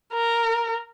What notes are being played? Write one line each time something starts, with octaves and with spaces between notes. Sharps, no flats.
A#4